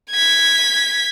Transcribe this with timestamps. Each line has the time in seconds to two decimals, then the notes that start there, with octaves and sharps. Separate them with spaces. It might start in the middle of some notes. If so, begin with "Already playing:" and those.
0.11 G#6 B6